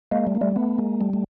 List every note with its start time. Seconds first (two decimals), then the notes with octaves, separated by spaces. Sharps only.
0.12 G#3 A#3
0.27 G3 A3
0.35 A#3
0.41 G3 A3
0.56 A3 B3
0.78 G#3 A#3
1.01 G3 A3
1.14 A3